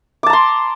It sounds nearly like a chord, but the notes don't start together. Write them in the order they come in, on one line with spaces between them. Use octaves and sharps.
D6 A5 A#5 C6